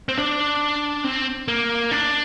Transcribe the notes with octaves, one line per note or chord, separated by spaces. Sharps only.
C4
D4
C4
A#3
D4